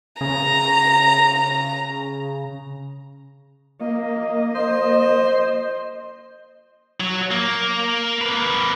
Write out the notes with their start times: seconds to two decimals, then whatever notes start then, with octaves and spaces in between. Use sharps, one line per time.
0.21 C#3 A#5
3.80 A#3 D#5
4.55 C5
7.00 F#3
7.31 A#3
8.21 A#3 B4